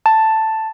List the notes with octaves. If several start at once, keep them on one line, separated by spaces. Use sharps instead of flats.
A5